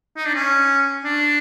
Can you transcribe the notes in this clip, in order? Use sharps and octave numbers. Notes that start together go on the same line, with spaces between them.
D#4
D4
C#4
D4